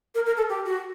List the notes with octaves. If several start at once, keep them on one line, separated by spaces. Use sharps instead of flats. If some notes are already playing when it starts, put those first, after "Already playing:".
A#4
A#4
A4
G4
F#4